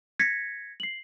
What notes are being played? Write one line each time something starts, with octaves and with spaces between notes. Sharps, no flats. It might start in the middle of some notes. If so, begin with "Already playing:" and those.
G#6 A#6 B6 C#7
C7 F#7